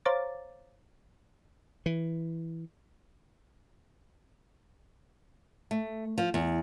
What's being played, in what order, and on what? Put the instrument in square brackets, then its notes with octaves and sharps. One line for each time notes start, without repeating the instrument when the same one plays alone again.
[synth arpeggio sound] C5 C#5 F5 A#5 D6 A6
[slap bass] E3
[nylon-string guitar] A3
F3
E2